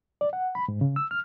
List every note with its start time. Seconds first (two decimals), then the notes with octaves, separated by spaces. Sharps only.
0.21 D5
0.33 F#5
0.55 B5
0.68 G#2
0.81 C#3
0.96 E6
1.11 F6